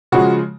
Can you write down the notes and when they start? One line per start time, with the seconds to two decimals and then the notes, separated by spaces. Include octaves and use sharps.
0.12 C#3 F3 G#3 F#4